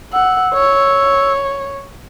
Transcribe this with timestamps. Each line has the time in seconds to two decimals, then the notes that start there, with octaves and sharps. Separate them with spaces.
0.13 F#5 E6
0.54 C#5